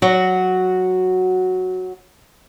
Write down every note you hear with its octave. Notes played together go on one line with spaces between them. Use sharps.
F#3 F#4